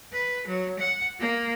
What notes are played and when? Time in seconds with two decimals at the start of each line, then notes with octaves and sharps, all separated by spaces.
0.12 B4
0.47 F#3
0.79 F#5
1.19 A#3